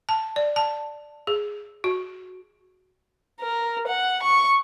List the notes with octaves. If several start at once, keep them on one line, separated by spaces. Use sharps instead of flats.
A5
D5
A5
G#4
F#4
A#4
F#5
C#6